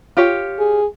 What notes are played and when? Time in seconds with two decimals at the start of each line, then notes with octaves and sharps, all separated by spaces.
0.17 F4 G4 C#5
0.59 G#4